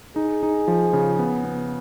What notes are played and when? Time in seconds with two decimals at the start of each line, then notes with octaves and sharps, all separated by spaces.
0.16 D#4 G#4
0.43 D#4
0.68 F3
0.93 C#3
1.19 B3
1.45 B3